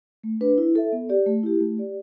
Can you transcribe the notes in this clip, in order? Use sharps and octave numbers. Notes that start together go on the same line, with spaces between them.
A3
D4 B4
E4
A4 E5
B3
G4 D5
A3
E4 G4
A3
G4 D5